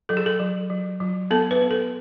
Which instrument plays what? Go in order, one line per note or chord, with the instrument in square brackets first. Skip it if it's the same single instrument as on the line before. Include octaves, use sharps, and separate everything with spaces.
[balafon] F#3 A4
G#4
A4
F#3
F#3
F#3
B3 A4
B4
B3
A4